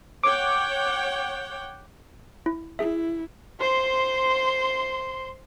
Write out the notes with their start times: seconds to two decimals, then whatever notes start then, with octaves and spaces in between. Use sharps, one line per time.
0.24 C#5 F#5 G5 D6
2.46 E4
2.79 E4 G#4 E5
3.60 C5 C6